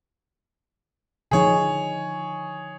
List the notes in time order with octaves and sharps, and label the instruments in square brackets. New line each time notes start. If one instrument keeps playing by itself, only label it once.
[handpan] D3 F3 D#4 [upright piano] G#4 C#5